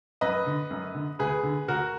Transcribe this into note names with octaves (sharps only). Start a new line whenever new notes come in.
F#2 B4 D#5
D3
F#2
D3
D2 G#4 B4
D3
D2 F#4 A#4